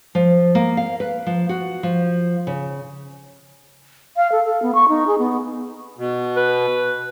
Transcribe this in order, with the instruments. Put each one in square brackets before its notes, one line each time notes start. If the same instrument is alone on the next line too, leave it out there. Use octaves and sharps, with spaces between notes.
[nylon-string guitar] F3
A#3
F5
B4
F3
F#4
F3
C#3
[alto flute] F5
A4
A4
B3
C#6
D#4
G#4
B3
[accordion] B2
[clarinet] B4